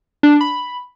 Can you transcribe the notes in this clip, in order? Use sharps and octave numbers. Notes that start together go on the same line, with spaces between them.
D4
B5